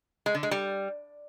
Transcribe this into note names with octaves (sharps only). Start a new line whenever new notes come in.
G#3
D3
G#3
G3